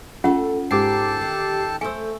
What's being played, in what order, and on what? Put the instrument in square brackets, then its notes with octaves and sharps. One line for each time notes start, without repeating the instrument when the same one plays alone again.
[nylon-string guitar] A3 A4 [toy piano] C#4 F4 F#5
[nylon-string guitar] G#2 A#3 [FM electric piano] G4 D6 C7 [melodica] A4 G5 A5
[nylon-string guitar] D#3
[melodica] A3 [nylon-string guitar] A4 C5 [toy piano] G#5 E6